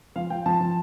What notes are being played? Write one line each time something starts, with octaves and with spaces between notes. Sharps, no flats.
F3 F5
F3 G5
F3 A5
F3